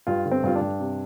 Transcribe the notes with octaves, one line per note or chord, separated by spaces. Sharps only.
G2 F4
D3
C4
G2 F4
D4
G2
C3